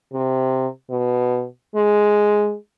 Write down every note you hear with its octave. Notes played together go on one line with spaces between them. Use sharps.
C3
B2
G#3